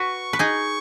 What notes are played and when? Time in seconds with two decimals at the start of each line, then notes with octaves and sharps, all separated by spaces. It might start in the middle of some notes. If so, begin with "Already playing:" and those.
Already playing: F#4 B4 C#6
0.33 B4
0.39 D#4 G#4 C#6